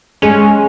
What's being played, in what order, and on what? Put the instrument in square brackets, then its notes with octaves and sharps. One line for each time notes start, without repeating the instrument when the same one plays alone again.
[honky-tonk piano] G#3 [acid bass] C#4